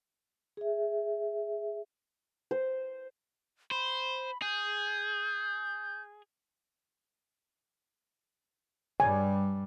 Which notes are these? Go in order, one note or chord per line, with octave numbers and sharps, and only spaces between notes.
G#4 E5
C5
C5 B5
G#4 G6
G2 G3 G#5